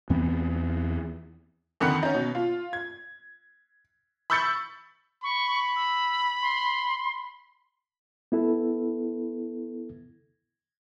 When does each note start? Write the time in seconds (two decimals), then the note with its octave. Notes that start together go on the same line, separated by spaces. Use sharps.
0.10 E2 E3 B3 C4
1.80 F2 D3 D#3 F#5 B5 C#7
2.03 C#4 D#4
2.15 B2
2.35 F4
2.73 G#6
4.30 B5 C#6 E6 G6 A6 C#7
5.24 B5 C#6
5.76 E6
6.42 C6
8.32 B3 E4 A4